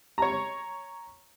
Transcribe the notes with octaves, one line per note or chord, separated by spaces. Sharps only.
C#5 A#5